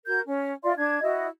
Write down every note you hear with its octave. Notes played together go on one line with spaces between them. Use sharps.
F#4 A#4 G6
C#4
F4 D5 E5 C6
D4 G#6
E4 F#4 D#5